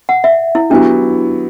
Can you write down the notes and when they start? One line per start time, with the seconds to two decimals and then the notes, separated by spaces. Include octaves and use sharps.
0.09 F#5
0.24 E5
0.55 E4
0.70 F#3 B3 D4 E4 G4